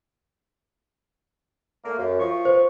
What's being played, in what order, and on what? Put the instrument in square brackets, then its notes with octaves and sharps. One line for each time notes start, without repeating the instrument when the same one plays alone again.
[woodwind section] A3 A#3
F#2
F3 C#6
[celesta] C5